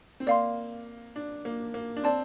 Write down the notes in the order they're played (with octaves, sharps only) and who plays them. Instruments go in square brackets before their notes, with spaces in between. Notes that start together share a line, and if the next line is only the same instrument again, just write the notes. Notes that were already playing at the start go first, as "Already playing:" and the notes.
[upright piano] C4
[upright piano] A#3 [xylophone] D5 F5 C6
[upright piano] D4
A#3
A#3
D4
[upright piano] C4 [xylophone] D5 A5 C6